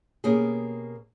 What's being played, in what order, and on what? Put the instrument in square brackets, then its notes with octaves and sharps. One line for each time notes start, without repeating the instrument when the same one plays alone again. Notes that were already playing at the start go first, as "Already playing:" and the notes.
[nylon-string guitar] B2 A#3 C#4 G4 G#4